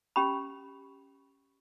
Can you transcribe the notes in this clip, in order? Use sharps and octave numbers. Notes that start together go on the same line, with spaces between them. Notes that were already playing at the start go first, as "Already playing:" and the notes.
C#4 G4 B5